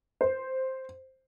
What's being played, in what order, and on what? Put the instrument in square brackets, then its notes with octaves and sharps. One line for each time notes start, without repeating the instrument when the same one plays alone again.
[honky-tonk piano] C5